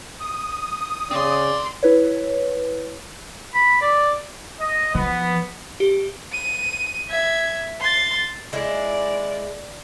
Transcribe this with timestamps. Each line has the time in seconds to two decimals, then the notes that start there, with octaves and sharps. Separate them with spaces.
0.20 D#6
1.11 C#3 C4 D5 C6
1.83 E4 B4 C#5
3.55 B5
3.81 D5
4.60 D#5
4.95 F3 B3
5.80 G4
6.32 D#7
7.09 E5 G#6
7.81 C6 A6
8.53 G#3 E4 D5